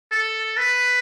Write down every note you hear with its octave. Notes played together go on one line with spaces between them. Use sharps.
A4
B4